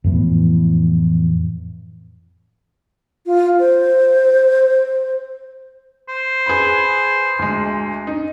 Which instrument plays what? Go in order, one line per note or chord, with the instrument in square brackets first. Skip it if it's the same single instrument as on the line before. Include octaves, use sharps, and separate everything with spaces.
[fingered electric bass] F2 A2 E3 B3
[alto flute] F4
C5
[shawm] C5
[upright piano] G#4 B4 B5
D2 G#3
D#4